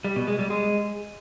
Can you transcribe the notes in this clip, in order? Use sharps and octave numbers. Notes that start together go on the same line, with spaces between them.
G3
B2
G#3
G3
G#3